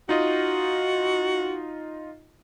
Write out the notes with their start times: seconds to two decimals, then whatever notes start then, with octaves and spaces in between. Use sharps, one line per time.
0.09 D#4 F4 F#4 D#5